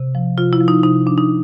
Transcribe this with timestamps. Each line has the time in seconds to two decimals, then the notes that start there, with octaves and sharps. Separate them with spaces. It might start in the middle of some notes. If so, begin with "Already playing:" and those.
Already playing: C3
0.15 F3
0.38 C3 F4
0.53 E4
0.61 F3
0.68 D#4
0.83 C3 D#4
1.06 F3 D4
1.18 D#4